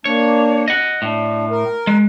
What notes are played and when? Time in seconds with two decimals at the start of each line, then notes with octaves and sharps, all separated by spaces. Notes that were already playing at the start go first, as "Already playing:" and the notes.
0.05 A#3 D4 C#5
0.68 D#5 F#5
1.02 A2 D4
1.50 A#4
1.87 G#3